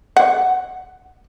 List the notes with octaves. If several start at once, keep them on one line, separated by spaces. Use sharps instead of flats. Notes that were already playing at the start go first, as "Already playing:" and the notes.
F#5